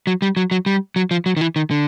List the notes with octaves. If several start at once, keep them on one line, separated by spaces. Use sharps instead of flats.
F#3
G3
F#3
F#3
G3
F#3
F3
F#3
D#3
E3
D#3
D3